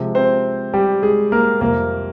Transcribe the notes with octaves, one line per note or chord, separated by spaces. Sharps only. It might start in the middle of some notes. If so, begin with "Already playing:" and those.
Already playing: C3 F3 G#3
C4 C5
G3 G4
G#3 G#4
A#3 A#4
F2 C3 G3 A#3 A#4